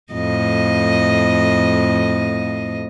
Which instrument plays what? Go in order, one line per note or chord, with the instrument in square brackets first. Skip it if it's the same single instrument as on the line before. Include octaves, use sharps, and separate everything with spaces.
[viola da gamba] F2 A2 D#5